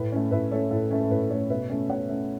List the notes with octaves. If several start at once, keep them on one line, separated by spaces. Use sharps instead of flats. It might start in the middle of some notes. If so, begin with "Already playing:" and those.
Already playing: A2 B4
A3 C#4
A2 B4 E5
A3 C#4 A4 C#5
A2 A4
A3 C#4
A4
A2 B4
A3 C#4 A4 C#5
B2 B4 E5
A3 C#4
B2 C#5 F#5
A3 C#4